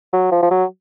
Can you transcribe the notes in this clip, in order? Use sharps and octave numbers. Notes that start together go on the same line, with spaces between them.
F#3
F3
F3
F#3